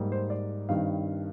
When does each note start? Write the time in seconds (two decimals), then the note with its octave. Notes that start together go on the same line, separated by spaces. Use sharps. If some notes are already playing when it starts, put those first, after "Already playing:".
Already playing: G#2 G3 A#3
0.12 C5
0.30 D5
0.69 G2 D#3 G3 C4 F5